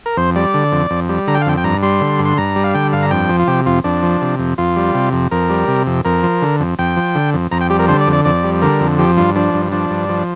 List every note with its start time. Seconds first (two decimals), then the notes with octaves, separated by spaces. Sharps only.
0.06 A#4
0.17 F2 C5
0.36 G3 D5
0.54 D3
0.72 F2
0.91 F2
1.09 G3
1.27 D3 A#5
1.35 G5
1.41 F5
1.46 F2 G5
1.58 G5
1.64 G2 A#5
1.82 G3 C6
2.01 D3
2.19 G2
2.25 C6
2.38 G2 A#5
2.56 G3
2.64 F5
2.74 D3 G5
2.93 G2 F5
3.02 A#5
3.11 F2 G5
3.29 F3
3.39 F4
3.47 C3 G4
3.66 F2 F4
3.84 F2 D4
4.03 F3
4.22 C3
4.39 F2
4.58 F2 F4
4.76 G3
4.95 C3
5.13 F2
5.31 F2 A#4
5.50 G3
5.68 C3
5.87 F2
6.05 F2 A#4
6.23 F3
6.42 D3
6.60 F2
6.79 F2 G5
6.97 F3
7.15 D3
7.34 F2
7.51 F2 A#5
7.61 G5
7.70 G3 G4
7.79 A#4
7.88 D3 C5
8.01 D5
8.07 F2
8.13 D5
8.25 F2 D5
8.43 G3
8.62 D3 A#4
8.80 F2
8.99 F3 G4
9.17 G2 F4
9.36 F3 D4
9.54 G2
9.72 F3 D4
9.90 G2
10.09 F3